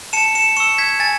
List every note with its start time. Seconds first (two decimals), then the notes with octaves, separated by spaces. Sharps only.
0.13 A5 C#7 E7
0.35 C#7 E7
0.57 C#6 E6 C#7 E7
0.78 G#6 B6
1.00 G#5 A6